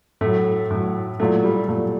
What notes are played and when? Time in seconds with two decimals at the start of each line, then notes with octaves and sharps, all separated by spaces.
0.21 A2 F#3 A3
0.71 A2 F#3
1.20 A#2 F#3 A3
1.44 G3
1.68 A#2 F#3 A3